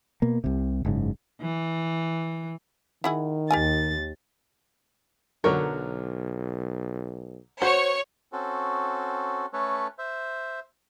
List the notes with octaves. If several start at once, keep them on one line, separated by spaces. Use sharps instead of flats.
B2 A#3
C2 C3
F#1 G#2 C#3
E3
D#3 E4 F#4 G#4
D#2 G4 A#4 G#5 A6
B1 D3 F#3 A#4 C#5
F#4 C5 C#5 C#6
C4 C#4 F#4 A4
A3 C#4 A4 B4 C#5
C5 E5